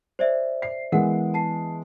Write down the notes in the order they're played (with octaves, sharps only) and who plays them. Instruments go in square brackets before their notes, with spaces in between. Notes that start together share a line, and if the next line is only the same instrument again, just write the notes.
[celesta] C5 D5 E5
[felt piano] C7
[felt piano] E3 G#3 B3 [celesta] A#4 F#5
[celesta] A5 C7